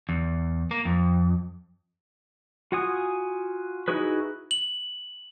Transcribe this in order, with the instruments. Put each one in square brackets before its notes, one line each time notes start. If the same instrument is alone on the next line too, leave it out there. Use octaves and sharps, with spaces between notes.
[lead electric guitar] E2
A#3
F2
[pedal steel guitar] F4 F#4 F#5 G#5 D#6
D#4 E4 F#4 G#4 B4
[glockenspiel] F#7